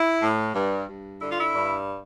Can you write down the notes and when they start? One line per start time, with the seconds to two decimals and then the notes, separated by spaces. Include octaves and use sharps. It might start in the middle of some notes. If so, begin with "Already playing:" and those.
Already playing: E4
0.22 A2
0.55 G2
0.88 G2
1.22 D3 E4
1.32 F4
1.40 E4
1.54 G2